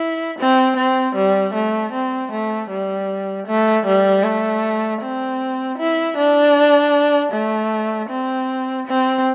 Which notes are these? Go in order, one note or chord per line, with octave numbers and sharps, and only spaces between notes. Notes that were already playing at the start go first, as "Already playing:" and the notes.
Already playing: E4
C4
C4
G3
A3
C4
A3
G3
A3
G3
A3
C4
E4
D4
A3
C4
C4